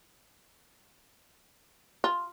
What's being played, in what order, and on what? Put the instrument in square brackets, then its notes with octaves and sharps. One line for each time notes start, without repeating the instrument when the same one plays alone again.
[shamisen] F4